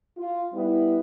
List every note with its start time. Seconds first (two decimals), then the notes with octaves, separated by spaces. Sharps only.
0.18 F4
0.53 G3 B3 E4